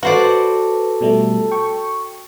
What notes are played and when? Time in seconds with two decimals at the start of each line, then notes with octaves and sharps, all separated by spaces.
0.03 F#4 A4 B4 C5 D5
1.01 B2 G3 A3
1.51 G5 C#6